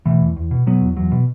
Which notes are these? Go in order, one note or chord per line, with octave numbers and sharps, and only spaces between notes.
B2 E3 A3
E2
E2
B2
B2 F#3 B3
E2
E2 F#3
B2